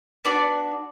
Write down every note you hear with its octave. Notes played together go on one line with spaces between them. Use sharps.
B3 D4 F#4 D5